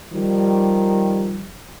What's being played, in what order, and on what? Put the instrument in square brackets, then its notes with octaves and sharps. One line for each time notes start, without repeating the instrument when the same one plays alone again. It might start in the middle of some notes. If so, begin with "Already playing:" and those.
[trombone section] D#3 F3 G3